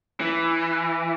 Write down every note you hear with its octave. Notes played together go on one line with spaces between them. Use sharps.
E3